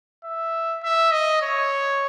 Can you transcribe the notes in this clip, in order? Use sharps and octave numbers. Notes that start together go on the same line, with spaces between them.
E5
E5
D#5
C#5